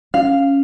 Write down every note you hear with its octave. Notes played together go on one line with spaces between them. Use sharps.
C#4 F5